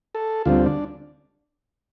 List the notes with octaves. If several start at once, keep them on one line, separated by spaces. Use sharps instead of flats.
A4
D2 D3 G3 C4 F4
D4